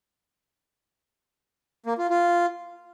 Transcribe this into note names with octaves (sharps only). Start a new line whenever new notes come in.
A#3
F4
F4